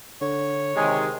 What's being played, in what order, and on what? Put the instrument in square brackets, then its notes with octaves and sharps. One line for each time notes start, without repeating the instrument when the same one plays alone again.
[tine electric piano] D3 [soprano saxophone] C#5
[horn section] C3 D#3 G#3 [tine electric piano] G4 G#5